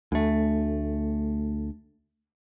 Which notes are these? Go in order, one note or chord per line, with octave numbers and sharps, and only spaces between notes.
D2 A3